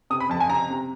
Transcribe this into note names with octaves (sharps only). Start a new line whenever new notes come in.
C3 D#6
B5
F2 A5
G#5
C3 A#5
C3